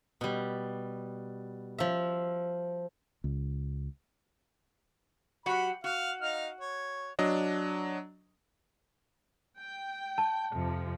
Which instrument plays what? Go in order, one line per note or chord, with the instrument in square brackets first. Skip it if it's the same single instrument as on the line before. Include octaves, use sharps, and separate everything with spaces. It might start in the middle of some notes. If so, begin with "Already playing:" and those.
[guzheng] B2 G3
F3 E5
[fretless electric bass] C#2
[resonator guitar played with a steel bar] F#3 F#4 G4 [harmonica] B5
[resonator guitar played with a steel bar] F#4 [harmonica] F5
[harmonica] D#4 F5 F6
C#5
[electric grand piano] F#3 D4 D#5
[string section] G5
[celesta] A5
[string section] F2 C3 F3